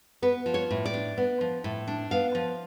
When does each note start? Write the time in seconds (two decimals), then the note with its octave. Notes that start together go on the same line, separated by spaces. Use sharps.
0.22 B3 B4
0.46 F3
0.54 C#5
0.71 A2
0.85 D5
0.94 D4
1.17 B3
1.41 F3
1.64 A2
1.87 D4
2.11 B3 F5
2.35 F3